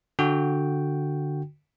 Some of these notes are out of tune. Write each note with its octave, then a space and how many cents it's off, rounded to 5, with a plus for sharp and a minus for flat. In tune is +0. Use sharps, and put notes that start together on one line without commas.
D3 +0 F#4 -5 G5 +0